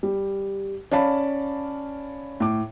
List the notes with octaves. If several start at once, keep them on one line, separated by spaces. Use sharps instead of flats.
G3
C#4 D5 F5 A5 B5
A2 D6